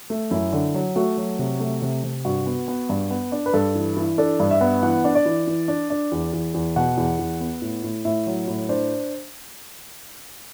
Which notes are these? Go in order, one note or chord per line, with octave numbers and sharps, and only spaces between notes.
A3
F#2 E4
D3
F#3
A3 F#4
F#3
C3
A3
C3
C3
G2 F#4
B3
B3
G2
B3
D4
B4
G2 A4
E3
E3
D4 A4
G2
E5
B3
E3 F#5
D4
D5
E3
E3
D4
D4
E2
E2
E2
B2 F#5
E2
E2
B3
A2
A2
A2 E5
F#3
A2
D4 C5